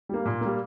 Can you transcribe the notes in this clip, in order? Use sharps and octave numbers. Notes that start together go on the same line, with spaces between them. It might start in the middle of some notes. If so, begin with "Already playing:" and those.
G3 A#3
A#2
G3 A#3